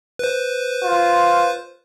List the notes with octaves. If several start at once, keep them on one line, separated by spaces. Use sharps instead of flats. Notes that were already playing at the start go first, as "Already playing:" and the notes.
B4 C5
F4